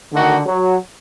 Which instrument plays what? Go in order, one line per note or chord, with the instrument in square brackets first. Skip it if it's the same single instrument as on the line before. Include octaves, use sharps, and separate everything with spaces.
[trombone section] D3 [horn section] D#3 A3 D#4 F#4
[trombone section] F#3